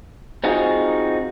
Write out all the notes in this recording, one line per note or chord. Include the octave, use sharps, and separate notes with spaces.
C4 D#4 F4 F#4 G#4